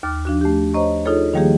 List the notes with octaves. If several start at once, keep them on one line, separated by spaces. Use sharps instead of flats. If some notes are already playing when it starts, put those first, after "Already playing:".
D#2 D6 F6 A6
F3 D4 F#4
A3 G4
C5 C#5 D#5 A#5 C#6
D#4 F4 G#4 A4 C#5
D#3 F3 G3 A#3 G4 G#4